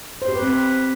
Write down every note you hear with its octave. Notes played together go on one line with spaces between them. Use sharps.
C5
G4
B4
C4
B4